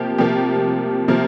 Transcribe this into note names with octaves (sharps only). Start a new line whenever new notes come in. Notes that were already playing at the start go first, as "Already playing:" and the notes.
Already playing: C3 F3 A#3 G4
C3 F3 A#3 G4
C3 F3 A#3 A#4